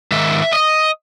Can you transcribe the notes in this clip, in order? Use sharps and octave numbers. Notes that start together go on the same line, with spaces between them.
G#2 D#3 E5
D#5